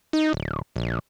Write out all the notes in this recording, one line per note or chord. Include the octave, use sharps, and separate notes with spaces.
D#4
D1
A#1